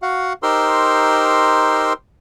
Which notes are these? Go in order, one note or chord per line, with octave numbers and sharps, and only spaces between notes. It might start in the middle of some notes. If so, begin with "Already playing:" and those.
F#4 F5 F#5
D#4 G4 A#4 C5 C6 E6